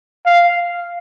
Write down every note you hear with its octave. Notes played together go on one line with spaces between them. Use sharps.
F5